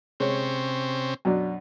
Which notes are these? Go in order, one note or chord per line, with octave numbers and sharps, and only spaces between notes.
C3 G#3 C4 C#4 C#5
F#2 B2 D4